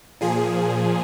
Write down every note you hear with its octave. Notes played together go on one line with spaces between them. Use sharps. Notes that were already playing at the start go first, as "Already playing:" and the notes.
A#2 F3 G#4